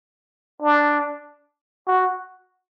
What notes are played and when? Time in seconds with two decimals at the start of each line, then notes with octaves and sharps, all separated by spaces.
0.62 D4
1.87 F#4